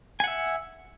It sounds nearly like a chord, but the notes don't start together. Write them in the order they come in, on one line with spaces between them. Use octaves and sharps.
G#5 F#5 E5